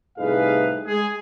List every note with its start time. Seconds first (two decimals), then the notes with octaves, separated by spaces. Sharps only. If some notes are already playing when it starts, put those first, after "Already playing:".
0.18 C2 A2 D#4 G#4 B4 F5
0.85 G#3 G#4